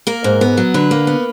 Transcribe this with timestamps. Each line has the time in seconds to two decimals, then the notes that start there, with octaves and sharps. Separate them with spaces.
0.07 A#3 A#4
0.24 G#2
0.41 B3
0.57 F#3
0.74 D3 B4
0.91 A#3
1.07 B3